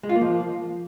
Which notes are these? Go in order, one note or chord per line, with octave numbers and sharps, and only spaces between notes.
G#3
F4
A#3
F3